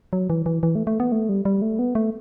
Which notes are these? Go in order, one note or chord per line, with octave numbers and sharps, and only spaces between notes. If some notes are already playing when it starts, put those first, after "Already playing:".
F#3
E3
E3
E3
A3
A3
B3
A3
G3
G3
A3
B3
A3